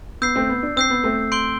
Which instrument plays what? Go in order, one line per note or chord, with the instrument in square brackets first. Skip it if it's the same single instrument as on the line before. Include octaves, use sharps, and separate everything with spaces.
[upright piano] B3 [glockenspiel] E6 G6 C7
[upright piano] A3 C4
B3
D4
[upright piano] C4 [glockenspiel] E6 G6 C7
[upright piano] B3
A3 C4
[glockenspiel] C6 G6 D7 G7